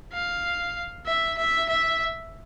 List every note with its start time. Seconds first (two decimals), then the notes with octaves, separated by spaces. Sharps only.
0.13 F5
1.06 E5
1.38 E5
1.69 E5